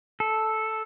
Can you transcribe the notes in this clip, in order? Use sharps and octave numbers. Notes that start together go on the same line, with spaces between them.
A4